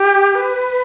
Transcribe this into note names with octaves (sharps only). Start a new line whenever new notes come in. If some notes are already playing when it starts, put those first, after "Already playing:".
Already playing: G4
B4